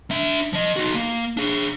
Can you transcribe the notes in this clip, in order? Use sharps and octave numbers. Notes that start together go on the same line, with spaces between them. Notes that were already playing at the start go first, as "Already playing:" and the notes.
D4 E5
F3 D#5
D#4 F#4
A#3
D4 G#4